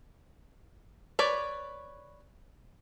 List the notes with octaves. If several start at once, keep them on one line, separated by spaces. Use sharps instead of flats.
B4 C#5 D5